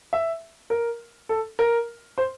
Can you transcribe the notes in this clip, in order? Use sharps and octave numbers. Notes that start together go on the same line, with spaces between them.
E5
A#4
A4
A#4
C5